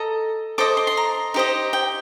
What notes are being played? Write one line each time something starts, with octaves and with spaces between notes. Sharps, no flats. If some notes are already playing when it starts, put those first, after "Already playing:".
Already playing: A4 D#5 A#5
A4 C5 D#5 D6
C6
C6
A#5
D#4 G4 C5 D#5
G5